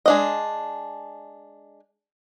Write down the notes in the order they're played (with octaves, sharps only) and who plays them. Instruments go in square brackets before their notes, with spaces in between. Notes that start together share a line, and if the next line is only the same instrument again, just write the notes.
[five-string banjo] G#3 D4 D#5